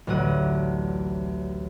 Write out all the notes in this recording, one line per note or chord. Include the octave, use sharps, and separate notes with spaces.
A1 D2 F#3 F#5 D#7